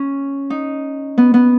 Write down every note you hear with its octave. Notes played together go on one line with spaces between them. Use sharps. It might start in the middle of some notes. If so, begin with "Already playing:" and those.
Already playing: C#4
D#4
B3
B3